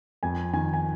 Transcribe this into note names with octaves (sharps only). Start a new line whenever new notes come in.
F2 G#5
D#3 G#5
G#5